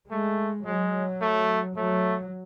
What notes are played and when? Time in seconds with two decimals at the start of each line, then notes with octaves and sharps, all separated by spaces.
0.10 G#3 A3
0.65 F#3 G#3
1.22 A3
1.76 F#3 A3